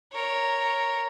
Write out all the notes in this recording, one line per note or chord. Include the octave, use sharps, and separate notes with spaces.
A#4 C#5